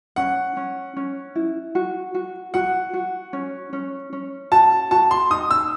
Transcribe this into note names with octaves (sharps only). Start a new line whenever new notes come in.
C#4 F#5
C#4
C#4
E4
F#4
F#4
F#4 F#5
F#4
C#4
C#4
C#4
F#4 A5
F#4 A5
C6
D#4 D#6
E6